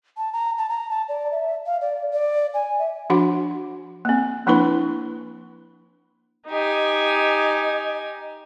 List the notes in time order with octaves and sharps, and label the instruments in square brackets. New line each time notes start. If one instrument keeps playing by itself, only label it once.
[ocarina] A5
A#5
A5
A#5
A5
D5
E5
F5
D5
D5
G#5
E5
[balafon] F3 D4 F#4 F#5 B5
A#3 C4
F3 A#3 D4 E4 B4 B5
[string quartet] D#4 G4 G#5 [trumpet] D#5